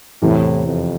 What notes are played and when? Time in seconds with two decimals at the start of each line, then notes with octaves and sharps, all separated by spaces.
0.22 E2 A2 C3 E3
0.68 F2